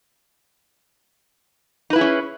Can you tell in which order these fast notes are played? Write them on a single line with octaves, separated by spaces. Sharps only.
D#4 B4 E4 G#4 C#4